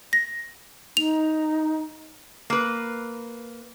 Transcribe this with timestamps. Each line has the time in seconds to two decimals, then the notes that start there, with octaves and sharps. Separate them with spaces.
0.13 A#6
0.97 D#4 F7
2.50 A#3 B4